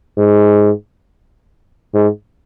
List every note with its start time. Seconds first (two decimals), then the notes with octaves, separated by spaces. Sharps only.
0.18 G#2
1.94 G#2